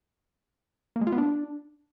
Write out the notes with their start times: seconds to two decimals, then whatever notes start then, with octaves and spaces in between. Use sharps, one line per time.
0.96 A#3
1.01 G#3
1.07 F4
1.12 B3
1.18 D4